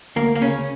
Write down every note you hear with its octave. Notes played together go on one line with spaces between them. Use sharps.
D2 A#3
A#3
C#3 C#4